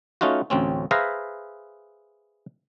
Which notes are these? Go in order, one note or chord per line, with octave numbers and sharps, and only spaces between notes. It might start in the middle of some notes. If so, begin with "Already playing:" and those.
A3 C#4 D#4 F4 F#4
A1 D2 C4 C#4
G#4 B4 C5 E5 F5 A#5